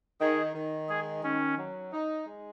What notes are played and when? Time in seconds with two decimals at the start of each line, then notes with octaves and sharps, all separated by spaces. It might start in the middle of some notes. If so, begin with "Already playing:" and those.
0.21 D#3 G#4
0.55 D#3
0.89 G#3 G#4
1.23 D#3 C#4
1.58 F#3
1.93 D#4
2.26 G#3